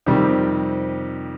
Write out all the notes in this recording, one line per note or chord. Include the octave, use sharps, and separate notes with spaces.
F2 C3 D#3 G3 C4